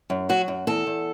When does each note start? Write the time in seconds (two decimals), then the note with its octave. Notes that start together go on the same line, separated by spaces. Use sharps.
0.10 F#2
0.29 F#3 F#4
0.48 F#2
0.67 E2 A4
0.87 E2